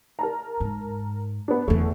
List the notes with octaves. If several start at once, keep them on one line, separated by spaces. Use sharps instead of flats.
A#4 A5 A#5
G#2
B3 D4
E2 D3 A3